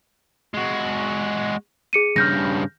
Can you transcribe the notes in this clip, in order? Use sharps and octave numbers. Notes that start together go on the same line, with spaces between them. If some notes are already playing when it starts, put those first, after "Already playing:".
G#3 F#4
G#4 C#7 D#7
G2 C#3 F6 G6 A#6